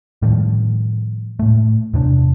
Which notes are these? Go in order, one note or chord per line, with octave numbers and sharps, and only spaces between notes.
A2 D#3 F3 G3
A2 A3
E2 C3 D4